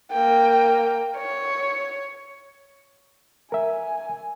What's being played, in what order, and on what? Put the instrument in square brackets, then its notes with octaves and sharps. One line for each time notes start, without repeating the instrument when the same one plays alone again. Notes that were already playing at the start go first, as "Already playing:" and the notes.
[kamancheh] A#3 G5
C#5
[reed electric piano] A#4 E5 [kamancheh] G#5